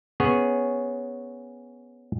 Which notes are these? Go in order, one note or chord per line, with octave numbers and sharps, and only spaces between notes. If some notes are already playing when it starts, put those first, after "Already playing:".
B3 C#4 G#4 C#5